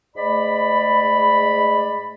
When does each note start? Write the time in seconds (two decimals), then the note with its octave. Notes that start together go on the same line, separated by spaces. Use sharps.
0.16 G#2 G#3 A3 D5 B5